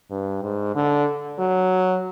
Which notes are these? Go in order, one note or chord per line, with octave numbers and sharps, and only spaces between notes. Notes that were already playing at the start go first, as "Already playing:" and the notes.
G2
G#2
D3
F#3